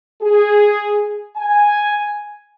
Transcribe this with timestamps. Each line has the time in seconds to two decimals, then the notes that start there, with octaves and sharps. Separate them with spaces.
0.22 G#4
1.36 G#5